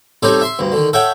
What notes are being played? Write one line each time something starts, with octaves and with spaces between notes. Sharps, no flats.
G3 C4 D#4 G4 A4 C#5
E5 C6
D2 G2
D3 D#3
A4 C#5 E5 F#5 G5